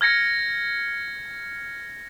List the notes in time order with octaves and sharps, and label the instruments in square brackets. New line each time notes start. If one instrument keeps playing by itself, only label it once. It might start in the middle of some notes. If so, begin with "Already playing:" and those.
[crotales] F6 G#6 A#6 C#7